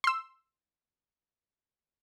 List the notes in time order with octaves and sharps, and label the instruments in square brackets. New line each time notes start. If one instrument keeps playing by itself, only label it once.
[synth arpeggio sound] C6 E6